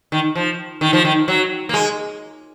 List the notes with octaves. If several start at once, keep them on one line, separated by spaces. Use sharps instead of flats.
D#3
F3
D#3
F3
D#3
F#3
A#3
G#3